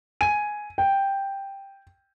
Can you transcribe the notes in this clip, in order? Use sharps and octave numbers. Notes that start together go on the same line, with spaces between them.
G#5 D#7
G5